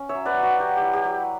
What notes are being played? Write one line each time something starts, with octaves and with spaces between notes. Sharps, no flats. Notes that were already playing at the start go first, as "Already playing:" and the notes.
Already playing: C#4
C#5 E5
F#3
B4 D5
F#3
F#4
F#3 G4
E4 G4
G4
F#3